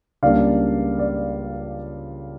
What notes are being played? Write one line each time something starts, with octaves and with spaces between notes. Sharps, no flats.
C#2 C#3 G3 A#3 D4 D5 F5
D5